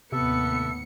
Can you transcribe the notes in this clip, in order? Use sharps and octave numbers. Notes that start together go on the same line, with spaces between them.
D#2 A2 C3 B3 A4 E5 C#7